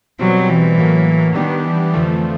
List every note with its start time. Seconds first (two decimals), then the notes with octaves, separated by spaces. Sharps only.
0.19 B2 F#3 G3 C4
0.49 E3
0.77 A2 F#3 A#3
1.35 D#3 G3 B3 D4 G4
1.64 E3
1.94 F2 D3 F3 A3